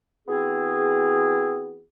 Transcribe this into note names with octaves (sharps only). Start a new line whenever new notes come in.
E3 B3 C4 F#4 G#4